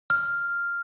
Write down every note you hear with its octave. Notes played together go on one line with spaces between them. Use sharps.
F6